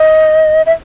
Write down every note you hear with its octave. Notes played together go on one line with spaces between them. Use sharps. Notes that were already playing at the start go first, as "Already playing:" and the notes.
Already playing: D#5
E5